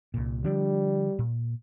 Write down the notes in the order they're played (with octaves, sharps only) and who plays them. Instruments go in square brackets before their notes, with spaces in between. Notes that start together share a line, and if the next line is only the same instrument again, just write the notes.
[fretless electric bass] C2 A#2
[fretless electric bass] D3 F3 D4 [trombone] G3
[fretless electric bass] A#2